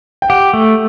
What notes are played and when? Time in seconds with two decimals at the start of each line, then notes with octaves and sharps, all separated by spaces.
0.22 G5
0.30 G4 F#5
0.53 A3